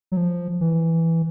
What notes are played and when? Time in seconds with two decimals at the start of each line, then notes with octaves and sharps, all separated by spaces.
0.12 F#3
0.17 F3
0.61 E3